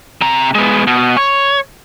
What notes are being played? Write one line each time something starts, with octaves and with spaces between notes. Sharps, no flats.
C3 A#5
G#3 B3
B2
C#5